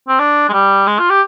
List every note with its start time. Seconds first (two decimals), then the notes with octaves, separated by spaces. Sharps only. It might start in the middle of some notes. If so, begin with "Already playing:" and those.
0.08 C4
0.19 D4
0.49 G#3
0.53 G3
0.87 G#3
0.99 F4
1.10 G4